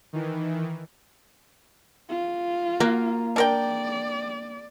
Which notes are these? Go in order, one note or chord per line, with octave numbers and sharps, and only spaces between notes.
D#3 E3
F4
A#3 F#4 A#4
D4 A#4 D5 G5